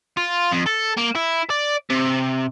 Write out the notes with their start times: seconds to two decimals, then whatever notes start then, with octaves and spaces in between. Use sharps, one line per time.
0.17 F4
0.51 F2
0.66 A4
0.97 A#3
1.15 E4
1.50 D5
1.90 C3